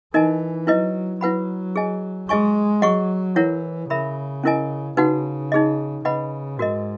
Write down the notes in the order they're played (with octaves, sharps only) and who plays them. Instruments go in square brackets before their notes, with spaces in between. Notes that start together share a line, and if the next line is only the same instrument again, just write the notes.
[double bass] E3 [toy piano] D#4 A#4 D#5 G#5
[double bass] F#3 [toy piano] E4 B4 D#5
[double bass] F#3 [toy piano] E4 B4 F#5 B5
[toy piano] G#4 D#5 G#5
[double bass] G#3 [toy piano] G#4 D#5 G#5 C#6
[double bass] F#3 [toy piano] G#4 D#5 F#5 C#6
[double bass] E3 [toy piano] E4 A#4 C#5 F#5
[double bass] C#3 [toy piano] A#4 E5 B5
[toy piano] C#4 E4 A#4 D#5 G#5
[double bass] C#3 [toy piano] D#4 F#4 B4 F#5
[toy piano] D#4 G#4 D#5
[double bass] C#3 [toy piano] B4 D#5 F#5 B5
[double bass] G#2 [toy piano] F#4 A#4 D#5